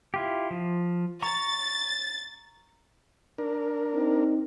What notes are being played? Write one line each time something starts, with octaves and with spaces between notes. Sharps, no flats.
E4 F4 G4
F3
A#5 C#6 A6
D4 A#4
C4 D#4